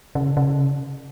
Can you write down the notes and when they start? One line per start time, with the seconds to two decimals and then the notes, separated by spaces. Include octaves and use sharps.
0.15 C#3
0.37 C#3